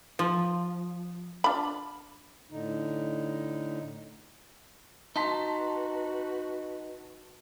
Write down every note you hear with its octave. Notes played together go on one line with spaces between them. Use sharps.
F3
D4 F4 B5
A2 D3 D#4
D#4 F#4 B4 A5 C6 B6